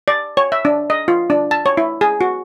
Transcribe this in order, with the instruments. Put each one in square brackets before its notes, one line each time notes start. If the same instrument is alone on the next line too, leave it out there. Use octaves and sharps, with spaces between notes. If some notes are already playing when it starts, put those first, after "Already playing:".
[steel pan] D5
C#5
E5
D4
D#5
F4
D4
A5
C#5
E4
G#4
F#4